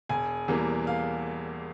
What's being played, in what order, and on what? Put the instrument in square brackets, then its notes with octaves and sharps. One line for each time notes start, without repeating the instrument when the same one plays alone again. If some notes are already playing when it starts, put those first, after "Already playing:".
[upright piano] E1 G#5
E2 E3 G3 A#3
F5